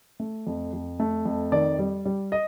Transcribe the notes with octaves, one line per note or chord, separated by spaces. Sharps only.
A3
F2
F2
A3
F2
D#3 D5
G3
G3
D#5